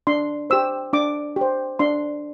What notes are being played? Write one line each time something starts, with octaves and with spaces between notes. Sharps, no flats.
D4 C6
G4 C5 E6
D4 D6
G4 C5
D4 C6